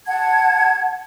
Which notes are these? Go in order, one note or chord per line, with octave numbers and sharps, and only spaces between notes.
F#5 A5 G#6